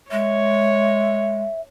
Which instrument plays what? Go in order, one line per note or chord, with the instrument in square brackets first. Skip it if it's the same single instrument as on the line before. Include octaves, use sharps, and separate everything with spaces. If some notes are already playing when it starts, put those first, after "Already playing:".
[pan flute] G#3 [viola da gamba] C#5 [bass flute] E5